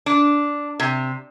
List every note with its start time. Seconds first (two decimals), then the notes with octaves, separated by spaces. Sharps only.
0.06 D4
0.80 C3